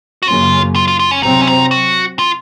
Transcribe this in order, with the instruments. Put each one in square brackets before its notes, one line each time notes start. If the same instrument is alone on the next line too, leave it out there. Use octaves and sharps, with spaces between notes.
[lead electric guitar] F#4
[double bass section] F#2 C#3 F#3 A#3 C#4 [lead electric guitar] F4
[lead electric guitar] F4
F4
F4
C#4
[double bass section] C3 F#3 C4 [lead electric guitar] D#4
[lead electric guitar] C#4
D#4
F#4
F4